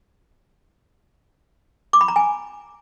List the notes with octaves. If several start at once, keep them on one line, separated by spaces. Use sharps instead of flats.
D6
B5
A#5
G#5